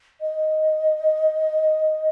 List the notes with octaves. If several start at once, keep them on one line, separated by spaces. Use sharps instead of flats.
D#5